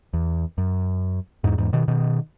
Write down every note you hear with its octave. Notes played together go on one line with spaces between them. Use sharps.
E2
F#2
E2 G#2
E2 G#2
B2 D#3
B2 D#3